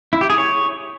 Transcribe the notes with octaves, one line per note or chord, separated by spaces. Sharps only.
E4
G4
G#4
C#5